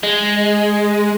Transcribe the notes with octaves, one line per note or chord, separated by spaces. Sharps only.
G#3